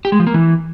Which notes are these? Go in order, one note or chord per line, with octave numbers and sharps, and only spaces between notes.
G4
G#3
F3
A#3
E3